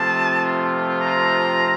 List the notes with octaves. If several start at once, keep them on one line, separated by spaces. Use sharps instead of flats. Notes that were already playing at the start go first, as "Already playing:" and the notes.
Already playing: C3 F3 A3 C4 F4 A5
A#5